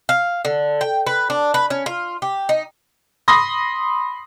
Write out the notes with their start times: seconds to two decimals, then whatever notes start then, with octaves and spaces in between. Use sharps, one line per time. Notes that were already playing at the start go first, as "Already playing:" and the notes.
0.09 F5
0.45 D3
0.81 G5
1.07 B4
1.30 D4
1.54 B4
1.70 C#4
1.86 F4
2.22 G4
2.49 D#4
3.28 B5 C6 D#6 A#6